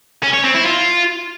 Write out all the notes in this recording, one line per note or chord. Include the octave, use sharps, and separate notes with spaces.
C#4
C#5
C4
E4
F4